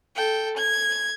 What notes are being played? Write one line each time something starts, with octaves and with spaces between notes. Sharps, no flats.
A4 G5
G#6